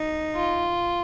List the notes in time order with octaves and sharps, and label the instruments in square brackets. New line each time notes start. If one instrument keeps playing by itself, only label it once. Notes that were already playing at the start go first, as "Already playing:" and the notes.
Already playing: [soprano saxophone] D#4
[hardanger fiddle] F4